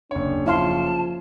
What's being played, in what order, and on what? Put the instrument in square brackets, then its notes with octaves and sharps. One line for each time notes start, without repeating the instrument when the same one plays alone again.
[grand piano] F#1 C#5 [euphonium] D4
[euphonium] F3 [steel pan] E4 F5 C6 [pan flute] A5